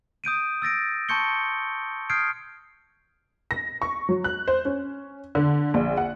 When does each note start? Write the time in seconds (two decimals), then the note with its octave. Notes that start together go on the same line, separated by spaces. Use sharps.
0.24 D#6 G6 D7 D#7
0.62 E6 A6 A#6 D7
1.09 A5 C6 C#6 G6 C#7 G7
2.10 D#6 F6 G6 G#6 C7 D7
3.51 A#6
3.82 C#6
4.09 F#3
4.24 F#6
4.48 C5
4.65 C#4
5.35 D3
5.74 A#1
5.97 F#5